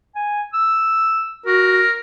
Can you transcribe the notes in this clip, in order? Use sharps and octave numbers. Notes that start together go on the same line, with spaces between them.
G#5
E6
F#4 A#4